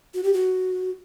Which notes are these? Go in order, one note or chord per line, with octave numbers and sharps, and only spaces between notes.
F#4
G4
F#4